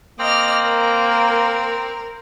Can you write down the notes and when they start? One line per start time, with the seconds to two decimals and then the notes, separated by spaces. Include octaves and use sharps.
0.20 A#3 C4 D#5 D6 F6
0.68 A#4